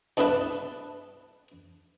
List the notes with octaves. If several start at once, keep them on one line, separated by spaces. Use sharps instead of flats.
C2 G2 B3 E4 B4 A5